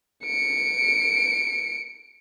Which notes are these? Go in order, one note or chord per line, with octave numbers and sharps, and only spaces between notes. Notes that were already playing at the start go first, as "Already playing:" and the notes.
C#7 D7